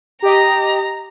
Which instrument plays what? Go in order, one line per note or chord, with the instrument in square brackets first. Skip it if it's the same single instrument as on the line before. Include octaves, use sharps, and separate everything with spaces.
[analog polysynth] G4 D#5 [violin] A#5